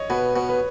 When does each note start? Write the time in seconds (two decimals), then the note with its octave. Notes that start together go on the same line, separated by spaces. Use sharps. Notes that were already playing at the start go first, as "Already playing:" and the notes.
Already playing: C#5 D#5
0.10 B2 B4
0.36 B2
0.49 B4